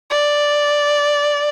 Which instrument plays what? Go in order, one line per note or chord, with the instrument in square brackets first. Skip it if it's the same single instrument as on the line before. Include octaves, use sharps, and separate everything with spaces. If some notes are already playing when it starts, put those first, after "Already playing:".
[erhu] D5